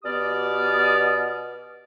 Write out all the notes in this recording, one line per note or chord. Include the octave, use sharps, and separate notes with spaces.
B2 B3 G4 D5 D#6 F6